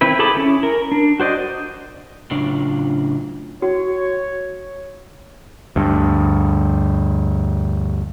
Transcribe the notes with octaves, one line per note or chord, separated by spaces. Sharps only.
D#3 C4 E4 B4
G#4 A4 A5 B5 D6
C#4 E4
A#4
D4
F#4 C5 D5 D#5
A2 C#3 F#3 D4 F4
F#4 C#5
D2 G2